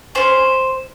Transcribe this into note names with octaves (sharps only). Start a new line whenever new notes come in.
C#4 G#4 C5